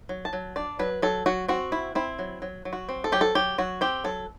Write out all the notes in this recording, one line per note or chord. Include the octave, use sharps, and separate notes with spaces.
F#3
A5
F#3
D4 D5
F#3 B4
F#3 A4
F#3 F#4
C4 F#4
E4
C4 E4
F#3
F#3
F#3
F#4
C4
A4
F#3 G4
A4
F#3 G4
F#3 F#4
C4 G4
F#3 A4